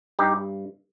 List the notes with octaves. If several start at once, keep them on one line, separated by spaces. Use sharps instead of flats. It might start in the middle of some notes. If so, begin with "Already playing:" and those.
G2 D#4 G4